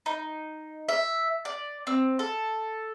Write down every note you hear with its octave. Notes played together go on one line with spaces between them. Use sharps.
D#4
E5
D5
C4
A4